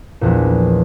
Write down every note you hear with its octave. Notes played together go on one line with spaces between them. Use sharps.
A#1 E2 A#2